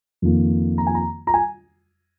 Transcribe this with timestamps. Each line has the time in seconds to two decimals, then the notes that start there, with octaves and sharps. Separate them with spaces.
0.22 F2 D#3 A#3
0.78 A#5
0.87 G#5
0.95 A#5
1.27 A#5
1.34 G#5